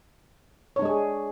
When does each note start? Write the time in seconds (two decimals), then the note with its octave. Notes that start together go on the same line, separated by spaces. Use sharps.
0.76 C#5
0.79 D4
0.82 G#3
0.85 G#4